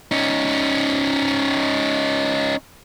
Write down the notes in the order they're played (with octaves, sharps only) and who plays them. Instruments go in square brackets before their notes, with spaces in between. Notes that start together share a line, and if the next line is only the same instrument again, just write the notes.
[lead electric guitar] C#4 D#4